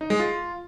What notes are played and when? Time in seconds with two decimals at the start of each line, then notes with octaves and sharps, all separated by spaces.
0.01 D#4
0.10 G#3
0.20 F4